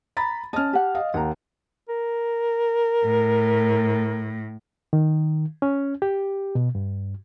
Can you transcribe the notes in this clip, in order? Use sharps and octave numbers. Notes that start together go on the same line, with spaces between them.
A#5 B5 A6
C#4 D#5 A5 F6
G4 F#5
D#5 F5
D#2 F#5 A#5
A#4
A2
D#3
C#4
G4
B2
G2